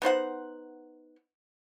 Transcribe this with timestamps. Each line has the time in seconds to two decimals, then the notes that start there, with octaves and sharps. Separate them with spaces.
0.02 B3 D#4 C5 F#5